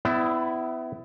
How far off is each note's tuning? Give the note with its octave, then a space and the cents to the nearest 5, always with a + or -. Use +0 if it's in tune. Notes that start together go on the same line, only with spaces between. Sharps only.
B3 +35 E4 +0 D5 +0